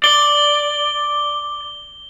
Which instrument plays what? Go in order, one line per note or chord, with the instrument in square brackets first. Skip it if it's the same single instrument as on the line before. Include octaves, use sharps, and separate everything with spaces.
[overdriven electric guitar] D5 [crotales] G7